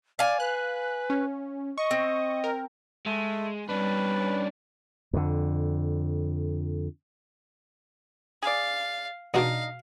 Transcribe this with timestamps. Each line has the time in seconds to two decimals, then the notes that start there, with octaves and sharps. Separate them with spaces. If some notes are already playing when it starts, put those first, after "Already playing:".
0.19 D5 F5 G#5
0.40 B4 F#6
1.10 C#4
1.78 D#5 C#6
1.91 C4
2.44 A#4
3.06 G#3 A3
3.69 G3 C#4 D4 B4
5.13 F2 D3
8.43 G#4 D5 F5
9.34 E2 B2 D4 D#4 F#4 D#5 F5